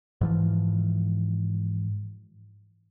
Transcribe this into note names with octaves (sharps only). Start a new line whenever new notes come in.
G#2 E3 F3